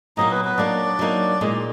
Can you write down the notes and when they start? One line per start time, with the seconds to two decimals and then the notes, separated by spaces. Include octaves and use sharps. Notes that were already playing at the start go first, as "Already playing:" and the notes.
0.17 A#2 F#3 A#3 D#4 D#5
0.31 B3 B4
0.45 B3 B4
0.58 F#3 A#3 D4 D#4 D5
0.99 F#3 A#3 D#4
1.41 A#2 G#3 D#4 D#5
1.52 D5